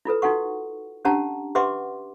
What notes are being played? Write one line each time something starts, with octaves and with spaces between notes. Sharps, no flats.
E4 F4 A4 B4
D#4 F#4 A4 F#5 C#6
C#4 D4 G4 F#5 A5 A#5
G4 B4 E5 F#5 C6 D6